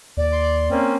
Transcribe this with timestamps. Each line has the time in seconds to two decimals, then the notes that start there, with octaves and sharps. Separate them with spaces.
0.17 D#2 D5
0.33 C6
0.71 A#3 C4 C#4